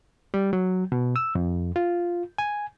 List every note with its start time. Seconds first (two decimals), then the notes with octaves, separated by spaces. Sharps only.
0.34 G3
0.53 F#3
0.92 B2
1.16 E6
1.35 F2
1.76 F4
2.38 G#5